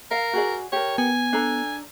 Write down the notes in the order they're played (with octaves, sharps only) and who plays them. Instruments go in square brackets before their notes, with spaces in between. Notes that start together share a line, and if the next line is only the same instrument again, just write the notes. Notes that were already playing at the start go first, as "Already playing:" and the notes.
[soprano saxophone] A#4 [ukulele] F5
[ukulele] F#4 G#4 D5
[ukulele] G4 A#4 [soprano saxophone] C#5
[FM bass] B3 [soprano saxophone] G#5
[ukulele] D4 A4 A#5